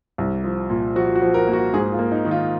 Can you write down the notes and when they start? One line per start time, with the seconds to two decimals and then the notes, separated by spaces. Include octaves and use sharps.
0.18 C2
0.44 F3
0.70 A#2
0.96 F3 F#4
1.15 F#4
1.22 F3
1.34 A#4
1.47 A#3
1.53 F#4
1.74 G#2 G#4
1.92 F4
1.99 A#3
2.12 D#4
2.25 D#3
2.31 F4